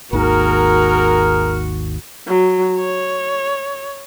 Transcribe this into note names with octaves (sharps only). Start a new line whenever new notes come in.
G#1 D#2 D#3 F#4 G#4 A#4
F#3
C#5